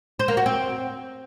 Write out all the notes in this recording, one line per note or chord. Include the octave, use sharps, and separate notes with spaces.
C5
A#3
F#4
C4